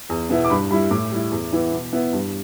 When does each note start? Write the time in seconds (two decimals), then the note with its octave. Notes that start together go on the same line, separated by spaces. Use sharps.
0.10 E2
0.29 B2 B3 E4
0.45 D6
0.50 G2 B5
0.70 G3 E4 B5
0.91 A2 D6
1.11 G3 E4
1.31 E2
1.53 E3 B3 E4
1.72 B2
1.93 B3 E4
2.13 G2